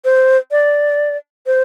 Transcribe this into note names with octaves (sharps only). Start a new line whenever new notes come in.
C5
D5
C5